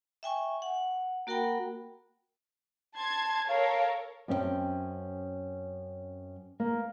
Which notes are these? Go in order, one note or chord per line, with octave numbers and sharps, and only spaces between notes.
E5 G5 G#5 C#6
F#5
A#3 F#4 A#4 F#5 G5 B5
A5 C6 G#6
A4 A#4 C#5 F5
F#2 C4 C#4 E5 G5 A5
A#3